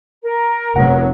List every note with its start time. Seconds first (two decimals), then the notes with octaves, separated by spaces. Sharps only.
0.23 A#4
0.76 F1 F#3 B3 F#5